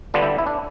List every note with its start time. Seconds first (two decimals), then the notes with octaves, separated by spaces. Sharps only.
0.14 D3 G3 B3 D4 F4
0.22 E4 G4
0.39 E4
0.46 D4